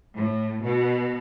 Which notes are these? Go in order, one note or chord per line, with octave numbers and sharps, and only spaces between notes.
A2
B2